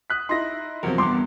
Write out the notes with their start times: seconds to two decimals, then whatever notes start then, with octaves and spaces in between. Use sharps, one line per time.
0.10 D#6 F#6 B6
0.29 D#4 E4 C6 A#6
0.83 E2 C3 F3 F#4 A#4
0.98 E2 G3 B3 C6 D6